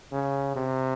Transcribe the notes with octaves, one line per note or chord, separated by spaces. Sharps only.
C#3
C3